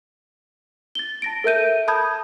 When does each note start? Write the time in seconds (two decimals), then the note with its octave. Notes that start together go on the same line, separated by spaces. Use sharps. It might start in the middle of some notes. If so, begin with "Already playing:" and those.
0.95 A6 G7
1.22 A5 A#6 D7
1.44 A4 A#4 E5 G6 D#7
1.88 A5 B5 D#6 G6 G#6